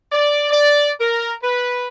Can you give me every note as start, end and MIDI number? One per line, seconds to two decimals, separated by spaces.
0.12 0.51 74
0.51 0.90 74
1.00 1.32 70
1.43 1.88 71